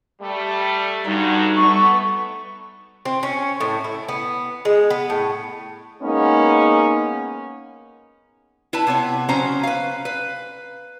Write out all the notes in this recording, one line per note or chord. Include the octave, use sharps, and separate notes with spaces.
G3 A3
G2 D3 G3 D#4 F#4
A3 B3 C#6
C4
C#4
A2
E4
B3
G#3
B3
A2
G#3 A#3 B3 C#4 D#4
E4 B4 A5
C3 B3 C#5
C#3 F#3 C#4 C5 A#5
B4 F5
B4